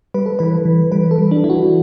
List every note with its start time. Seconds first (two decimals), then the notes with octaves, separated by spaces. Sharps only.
0.14 G3 B4
0.26 A4
0.39 E3 B4
0.65 E3
0.92 G3 B4
1.11 A4
1.18 G3
1.31 D4
1.44 E3 E4
1.50 F#4